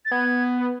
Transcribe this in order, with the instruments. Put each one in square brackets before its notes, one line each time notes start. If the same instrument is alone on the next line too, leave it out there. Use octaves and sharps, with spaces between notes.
[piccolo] A6
[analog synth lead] B3 [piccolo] G#6